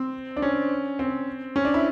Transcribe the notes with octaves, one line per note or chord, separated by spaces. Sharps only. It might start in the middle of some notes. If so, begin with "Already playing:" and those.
Already playing: C4
D4
C#4
C4
C#4
D4
E4